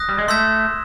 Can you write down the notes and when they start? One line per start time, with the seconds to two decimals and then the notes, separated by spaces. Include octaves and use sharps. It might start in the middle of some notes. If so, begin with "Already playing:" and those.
Already playing: D#6 F#6 A#6
0.09 G3
0.18 G#3
0.28 A3 C6 E6 G#6 B6 E7